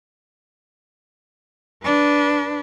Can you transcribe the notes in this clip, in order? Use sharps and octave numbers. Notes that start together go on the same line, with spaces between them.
D4 B4